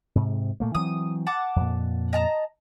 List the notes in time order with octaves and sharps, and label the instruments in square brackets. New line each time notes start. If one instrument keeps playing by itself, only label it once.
[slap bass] G#2 C3
A#2 A3 A#3
[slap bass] E3 F#3 C4 [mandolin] D#6
[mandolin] F#5 A5 D6
[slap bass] F2 A#2
[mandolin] D#5 A5 A#5